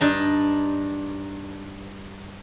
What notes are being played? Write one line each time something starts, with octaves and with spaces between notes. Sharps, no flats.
G2 D4 D#4